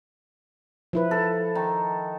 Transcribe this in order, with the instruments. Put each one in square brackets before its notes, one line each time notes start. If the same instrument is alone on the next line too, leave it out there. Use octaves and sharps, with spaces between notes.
[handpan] F3 E4 B4
[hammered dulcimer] A4
D#3